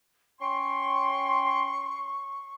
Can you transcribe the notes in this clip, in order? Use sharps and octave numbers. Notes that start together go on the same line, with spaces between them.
C#4 G5 C6 C#6